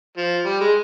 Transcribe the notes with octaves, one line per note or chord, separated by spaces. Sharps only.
F3
G3
G#3